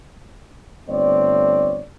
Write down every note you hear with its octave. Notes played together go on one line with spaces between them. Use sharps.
G1 A3 C4 C#5 D5